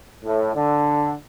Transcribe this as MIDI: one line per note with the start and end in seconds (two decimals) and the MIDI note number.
0.25 0.53 45
0.55 1.12 50